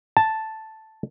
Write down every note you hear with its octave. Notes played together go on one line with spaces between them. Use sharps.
A5